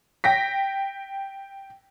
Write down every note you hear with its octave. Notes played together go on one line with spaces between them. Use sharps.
G5 A#6 B6